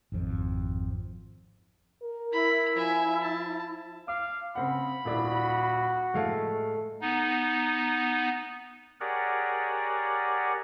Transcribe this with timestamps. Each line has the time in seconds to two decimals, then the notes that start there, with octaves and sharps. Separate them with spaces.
0.12 G#1 F2
2.02 A#4
2.33 E4 B5
2.76 F3 E5 G#5
3.22 A5
4.08 F5 D6
4.55 C#3 C4 F#5 B5
5.05 D#1 D4 E4 F#4
6.14 A2 G#3 A3 F5
7.01 B3 D#4
9.00 G4 G#4 A#4 C#5 D5 F#5